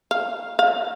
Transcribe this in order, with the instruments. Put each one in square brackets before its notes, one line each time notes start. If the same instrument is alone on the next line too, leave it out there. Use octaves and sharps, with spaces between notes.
[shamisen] F5
F5